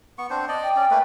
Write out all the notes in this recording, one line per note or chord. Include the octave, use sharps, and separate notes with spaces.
B3 C#6
C4 D4 C5
D5 D#5
G5
C#4 D5
A3 A#3 B4